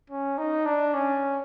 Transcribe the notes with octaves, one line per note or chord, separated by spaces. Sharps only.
C#4
D#4
D4
C#4